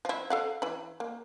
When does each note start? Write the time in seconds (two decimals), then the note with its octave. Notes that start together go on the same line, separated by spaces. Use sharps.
0.05 F3 E4
0.30 A4 F5 F#5
0.62 E3 B5
1.00 A#3